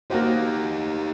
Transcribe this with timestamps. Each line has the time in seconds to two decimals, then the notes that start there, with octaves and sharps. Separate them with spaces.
0.10 A#3 D#4 F#4 G4 C5